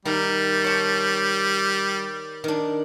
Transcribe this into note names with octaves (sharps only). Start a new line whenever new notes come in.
D#3 G3 A#5
C#5 A5
D#3 D4